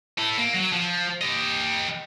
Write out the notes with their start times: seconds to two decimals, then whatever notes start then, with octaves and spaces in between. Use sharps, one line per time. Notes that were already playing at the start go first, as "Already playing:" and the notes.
0.19 E4 A4
0.38 A#3
0.54 F#3
0.73 F3
1.21 G4 D#5